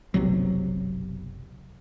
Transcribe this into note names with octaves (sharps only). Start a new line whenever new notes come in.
F#1 B1 C3 F#3